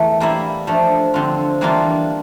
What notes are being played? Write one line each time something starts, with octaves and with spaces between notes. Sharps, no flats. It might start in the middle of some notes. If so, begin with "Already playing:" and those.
Already playing: E2 E3 A3 A#4
G3 A#3 E4
F3 A3 D4
D3 F3 C4 F4
E3 G3 A#3 D4 F4